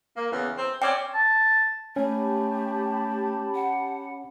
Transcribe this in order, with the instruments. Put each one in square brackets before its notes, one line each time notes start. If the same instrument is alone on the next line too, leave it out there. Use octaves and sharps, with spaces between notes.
[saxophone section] A#3
E2 C#3 E3
C4
[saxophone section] C4 C#4 D5 [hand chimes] G5 D6
[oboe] A5
[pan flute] A3 [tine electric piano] C#4 [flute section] G4 A5 B5
[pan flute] F#5